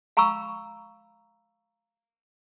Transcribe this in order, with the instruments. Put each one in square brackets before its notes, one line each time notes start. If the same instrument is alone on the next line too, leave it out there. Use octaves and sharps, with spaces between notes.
[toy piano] F5 A#5 B5 C#6 E6